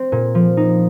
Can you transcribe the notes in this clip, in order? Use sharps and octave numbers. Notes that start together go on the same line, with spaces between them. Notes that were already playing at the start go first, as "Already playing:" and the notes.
Already playing: C4
A#2
F3
D#4